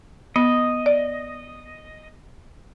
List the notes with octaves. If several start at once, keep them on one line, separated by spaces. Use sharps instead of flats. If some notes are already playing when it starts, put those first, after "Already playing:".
B3 D#5
D5